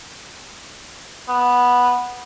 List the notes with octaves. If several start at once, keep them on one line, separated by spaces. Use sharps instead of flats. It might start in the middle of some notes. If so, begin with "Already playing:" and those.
B3